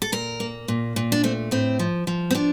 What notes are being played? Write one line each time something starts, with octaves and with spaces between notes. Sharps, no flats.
A4
A#2 A#4
A#3
A#2
A#2
D4
A3 C4
A2 C4
F3
F3
C4
F3 D4